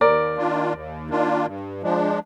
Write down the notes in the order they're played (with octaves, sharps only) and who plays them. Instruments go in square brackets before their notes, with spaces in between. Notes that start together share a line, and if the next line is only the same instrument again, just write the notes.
[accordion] D#2 [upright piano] A#4 D5
[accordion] D#3 A#3 D4 F4
D#2
D#3 A#3 D4 F4
G2
F3 G#3 D4